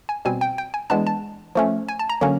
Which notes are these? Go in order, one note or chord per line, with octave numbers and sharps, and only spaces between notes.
G#5
B2 G3 C4 G#5
G5
G5
G#5
E3 G#3 B3 D4 A5
A5
F3 A3 C#4
G#5
A5
A#5
D3 F#3 A#3 C#4